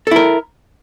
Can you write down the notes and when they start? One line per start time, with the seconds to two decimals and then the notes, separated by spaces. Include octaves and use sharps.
0.07 A4
0.11 E4
0.16 A#4